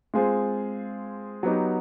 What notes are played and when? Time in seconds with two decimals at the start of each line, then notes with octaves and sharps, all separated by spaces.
0.14 G#3 C4 F4 G#4 C5
1.43 F#3 B3 D#4 G4